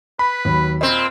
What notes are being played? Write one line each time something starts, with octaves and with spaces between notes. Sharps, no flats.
B4 B5
D#2 F#3
A#2 C4 D#5